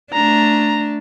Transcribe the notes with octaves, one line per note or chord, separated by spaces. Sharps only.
A3 D4 A#5